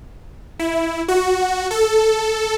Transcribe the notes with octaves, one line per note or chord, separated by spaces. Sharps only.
E4
F#4
A4